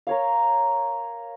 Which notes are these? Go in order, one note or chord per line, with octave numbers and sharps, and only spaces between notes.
A#4 C#5 F5